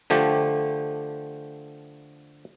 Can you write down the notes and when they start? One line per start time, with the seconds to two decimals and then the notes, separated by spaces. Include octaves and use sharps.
0.10 D3 F3 A3 G4